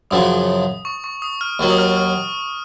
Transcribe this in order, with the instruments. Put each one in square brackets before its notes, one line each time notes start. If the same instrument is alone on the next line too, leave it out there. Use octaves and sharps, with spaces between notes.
[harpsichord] F#2 C#3 F3 [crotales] D#6
[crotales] C#6
C#6
D#6
F6
[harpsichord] D#2 D#3 F#3 [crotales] C#6
[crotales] D#6
F6
F6